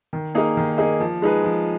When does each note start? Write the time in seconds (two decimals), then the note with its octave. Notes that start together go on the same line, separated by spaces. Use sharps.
0.13 D#3
0.35 A#3 D#4 G#4 D#5
0.57 D#3
0.78 A#3 D#4 G#4 D#5
1.00 F3
1.22 G#3 D#4 G#4 B4
1.44 F3